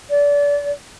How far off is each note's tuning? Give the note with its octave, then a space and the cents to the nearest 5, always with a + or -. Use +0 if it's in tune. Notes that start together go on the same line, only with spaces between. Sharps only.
D5 -30